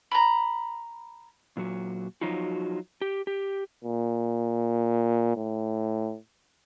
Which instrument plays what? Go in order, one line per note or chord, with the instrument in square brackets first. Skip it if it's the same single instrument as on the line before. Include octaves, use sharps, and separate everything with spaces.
[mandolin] A#5 B5
[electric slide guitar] A#2 F#3 F#4
F3 F#3 D#4 F4 F#4
G4
G4
[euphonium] A#2
A2